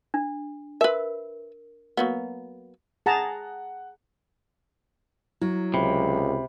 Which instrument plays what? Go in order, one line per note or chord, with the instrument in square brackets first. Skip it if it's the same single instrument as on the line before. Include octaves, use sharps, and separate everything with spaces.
[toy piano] D4
[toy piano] A#4 [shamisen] B4 E5
[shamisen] F#3 A#3 B3
[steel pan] G#4 A5 A#5 [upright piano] F#5
[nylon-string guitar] F#3 [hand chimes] E4
[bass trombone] C#2 [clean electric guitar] C3 [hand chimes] B5